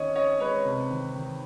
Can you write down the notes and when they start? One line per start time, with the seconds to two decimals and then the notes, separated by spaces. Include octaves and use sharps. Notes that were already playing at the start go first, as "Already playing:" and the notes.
Already playing: D#3 C#4 C#5 D#5
0.15 C#4 C#5 D#5
0.40 G#3 B4 C#5
0.65 C3
0.90 D#3
1.16 D#3